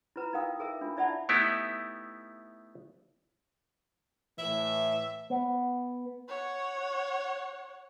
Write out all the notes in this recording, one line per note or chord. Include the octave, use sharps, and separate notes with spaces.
E4 F4 B4 A#5
D#4 E4 A#4 F5 G5 D#6
A4 A#4 E5
D4 F4
E4 D5 E5 F#5 A5 B5
A3 B3 D#4 E4 G4
A2 E3 E5
B3
C#5 F#5